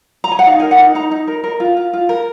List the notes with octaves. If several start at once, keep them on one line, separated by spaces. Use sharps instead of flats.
A#5
G#5
F#5
D#4 F5
A#4 G#5
F#5
D#4
D#4 A#5
D#4
A#4
A#4
F4
F4
F4
A#4